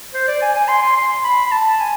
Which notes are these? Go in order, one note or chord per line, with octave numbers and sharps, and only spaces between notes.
C5
D5
G#5
G#5
C6
C6
C6
B5
B5
A5
G#5